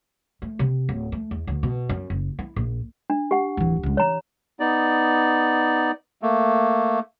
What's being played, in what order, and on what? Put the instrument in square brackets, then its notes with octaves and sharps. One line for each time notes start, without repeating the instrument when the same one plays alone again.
[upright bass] A3
C3
D1
A3
E2
D2
B2
F#2
F#1
E4
A#1
[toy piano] D4
G4 F#5
[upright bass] D1 E3
C#2 G#3
[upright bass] E3 [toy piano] C#5 A#5
[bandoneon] B3 D#4 D5
A3 A#3